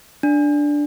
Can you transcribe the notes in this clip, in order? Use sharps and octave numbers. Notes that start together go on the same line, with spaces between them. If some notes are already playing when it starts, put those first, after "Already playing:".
D4